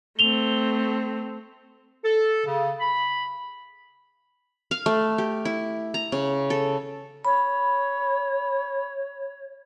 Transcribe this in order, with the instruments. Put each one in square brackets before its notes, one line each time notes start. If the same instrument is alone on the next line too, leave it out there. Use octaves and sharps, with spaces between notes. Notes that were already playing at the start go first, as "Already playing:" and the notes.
[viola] A3 C4 [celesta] F7 G7
[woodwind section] A4
C#3
B5
[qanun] F5
A3
G4
E4
A#5
C#3
A4
[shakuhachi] C#5 [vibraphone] B5